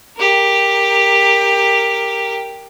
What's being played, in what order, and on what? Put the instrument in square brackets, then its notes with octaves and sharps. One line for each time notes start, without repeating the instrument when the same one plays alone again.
[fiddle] G4 A#4